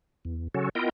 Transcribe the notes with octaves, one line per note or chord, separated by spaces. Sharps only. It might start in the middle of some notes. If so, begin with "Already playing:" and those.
E2
C#3 F#3 C#4 F#4 A4
B3 E4 F4 A#4 D#5 G5